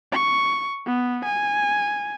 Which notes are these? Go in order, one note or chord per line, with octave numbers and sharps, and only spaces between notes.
C#6
B3
G#5